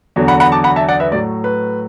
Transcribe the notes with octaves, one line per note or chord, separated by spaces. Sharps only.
E2 D3 F#3
F#5 B5
F#5 B5
A5 D6
F#5 B5
E5 A5
D5 F#5
B4 E5
A2 F#3 D5
B4